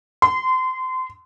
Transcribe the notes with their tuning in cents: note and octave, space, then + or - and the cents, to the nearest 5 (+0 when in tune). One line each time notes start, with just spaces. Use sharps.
C6 -30